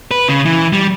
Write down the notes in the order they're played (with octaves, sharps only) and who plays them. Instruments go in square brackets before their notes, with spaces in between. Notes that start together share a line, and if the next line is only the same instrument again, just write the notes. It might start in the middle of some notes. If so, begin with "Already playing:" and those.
[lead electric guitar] B4
C#3
E3
G3